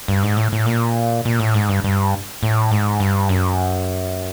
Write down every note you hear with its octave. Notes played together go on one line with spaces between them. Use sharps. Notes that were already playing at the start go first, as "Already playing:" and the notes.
G2
G#2
A2
A2
A#2
A#2
A2
G#2
G2
G2
A2
G#2
G2
F#2